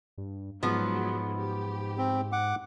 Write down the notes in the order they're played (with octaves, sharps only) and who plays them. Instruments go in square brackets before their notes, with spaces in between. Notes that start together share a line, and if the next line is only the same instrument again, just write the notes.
[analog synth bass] G2
[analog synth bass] G#2 [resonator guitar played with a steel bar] F3 B3 [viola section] F#3 G#3
[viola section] G4
[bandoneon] C4
F#5 D6